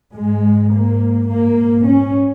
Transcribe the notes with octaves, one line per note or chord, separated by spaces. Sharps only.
G#2 G#3
A#3
G#2 A#3
C#4